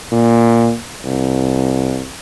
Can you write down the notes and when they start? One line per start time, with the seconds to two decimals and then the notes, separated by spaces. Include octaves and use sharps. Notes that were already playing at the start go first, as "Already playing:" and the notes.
0.12 A#2
1.05 C2